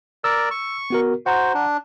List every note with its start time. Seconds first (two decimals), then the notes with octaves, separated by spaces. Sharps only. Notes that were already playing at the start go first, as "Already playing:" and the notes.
0.24 A#4 D5 E6
0.51 C#6
0.90 B3 F#4 A#4
1.26 F#4 C5 F#5 A#5
1.54 D4